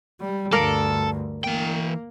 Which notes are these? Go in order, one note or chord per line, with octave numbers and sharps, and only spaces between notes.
G3
D2 G2 A4 A#4 D5 F5
E3 A#3 G5